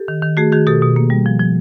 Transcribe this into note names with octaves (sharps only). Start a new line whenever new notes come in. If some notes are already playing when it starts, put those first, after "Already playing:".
Already playing: G4 A4
D#3
D#3
A3 F#4 G#4
D#3 F#4 G#4
B2 G4 A4
B2
A#3
G3
F3
F3